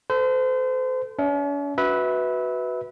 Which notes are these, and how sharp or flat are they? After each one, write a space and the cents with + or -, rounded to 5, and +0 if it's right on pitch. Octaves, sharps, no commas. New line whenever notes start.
A4 +0 C5 -35
C#4 +45 E5 -15
F#4 +0 B4 +0 E5 -25